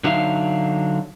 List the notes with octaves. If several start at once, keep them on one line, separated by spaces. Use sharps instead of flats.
D3 F#3 D4 D#4 E5 F5